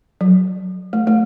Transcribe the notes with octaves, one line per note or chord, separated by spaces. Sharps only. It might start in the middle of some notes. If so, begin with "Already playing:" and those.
F#3
A3
A3